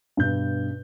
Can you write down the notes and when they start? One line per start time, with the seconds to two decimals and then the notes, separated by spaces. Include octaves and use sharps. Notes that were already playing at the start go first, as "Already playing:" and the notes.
0.17 G2 B2 G6